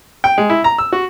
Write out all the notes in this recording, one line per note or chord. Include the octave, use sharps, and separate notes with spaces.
G5
G#3
E4
A#5
E6
F#4